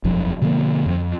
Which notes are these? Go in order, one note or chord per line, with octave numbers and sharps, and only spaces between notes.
E1 B1 F#2 F3
B2 D3 F3 A#3
F2 F3